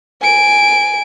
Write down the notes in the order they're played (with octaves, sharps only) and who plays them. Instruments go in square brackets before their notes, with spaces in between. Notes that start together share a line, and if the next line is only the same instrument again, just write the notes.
[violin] G#5 D7